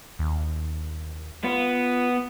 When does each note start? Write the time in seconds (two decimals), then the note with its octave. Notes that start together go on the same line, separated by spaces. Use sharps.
0.19 D#2
1.44 B3 F4